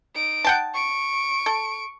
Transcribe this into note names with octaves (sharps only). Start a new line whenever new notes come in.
D#4 D7
F#5 G5 A5
C#6 D7
A4